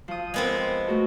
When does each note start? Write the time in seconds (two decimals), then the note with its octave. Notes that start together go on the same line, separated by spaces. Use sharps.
0.08 F3 D#6
0.34 G#3 B3 C4
0.87 A3 F#4 A4